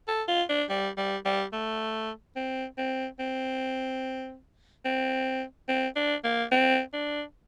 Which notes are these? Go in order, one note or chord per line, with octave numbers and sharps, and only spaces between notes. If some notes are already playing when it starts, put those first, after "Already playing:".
A4
F4
D4
G3
G3
G3
A3
C4
C4
C4
C4
C4
D4
A#3
C4
D4